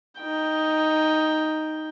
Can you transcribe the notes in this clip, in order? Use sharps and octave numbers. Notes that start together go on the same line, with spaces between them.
D#4 G5